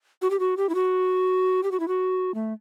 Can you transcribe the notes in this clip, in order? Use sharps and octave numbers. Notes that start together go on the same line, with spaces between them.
F#4
G4
F#4
G4
E4
F#4
G4
F#4
E4
F#4
A3